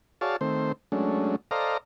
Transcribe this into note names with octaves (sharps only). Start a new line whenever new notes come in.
F#4 G#4 C#5 D5 F5 A5
D#3 A3 C4 C5
F#3 G#3 A3 C#4 D4
A4 C5 D5 D#5 F5 A#5